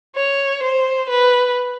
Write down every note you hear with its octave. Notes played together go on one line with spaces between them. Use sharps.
C#5
C5
B4